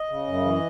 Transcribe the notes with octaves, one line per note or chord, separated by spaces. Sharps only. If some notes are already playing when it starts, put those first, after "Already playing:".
Already playing: D#5
C#3
F#2
E3